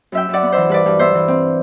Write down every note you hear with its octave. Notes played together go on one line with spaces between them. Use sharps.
F#2 E5 G5
F#2 D5 F#5
B3
E3 C5 E5
G2 B4 D5
G2
B3 C5 E5
E3
C4